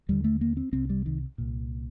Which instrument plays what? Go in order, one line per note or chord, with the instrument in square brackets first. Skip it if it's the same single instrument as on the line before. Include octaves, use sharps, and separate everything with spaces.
[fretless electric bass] D#2 D3 G3
A3
A#3
C4
C2 C3 C4
G3
D#3
C2 A#2